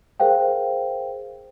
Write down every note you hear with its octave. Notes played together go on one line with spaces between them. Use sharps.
G#4 A#4 C5 F5 G5